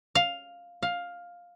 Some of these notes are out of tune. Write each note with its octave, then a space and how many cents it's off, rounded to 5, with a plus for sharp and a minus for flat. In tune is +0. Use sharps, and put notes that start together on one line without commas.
F5 +5
F5 +10